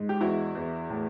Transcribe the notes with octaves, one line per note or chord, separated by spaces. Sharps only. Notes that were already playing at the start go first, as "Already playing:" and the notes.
Already playing: G#2
G4
E2 E4 F#4
E2
A2